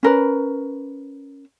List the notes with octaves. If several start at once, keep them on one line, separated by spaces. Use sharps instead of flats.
C#4 A#4 B4